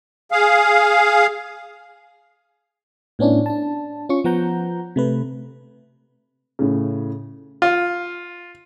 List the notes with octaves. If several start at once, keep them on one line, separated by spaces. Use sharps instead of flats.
G#4 F5
A2 B3 C#4 D4 E4
D4 A5
C#4 F4 C#6
F3 B3 F#5 A#5 G6
C3 A3 B4
A2 C#3
F4